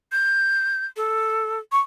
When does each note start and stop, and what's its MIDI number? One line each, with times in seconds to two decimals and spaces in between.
0.12 0.86 91
0.96 1.59 69
1.72 1.80 85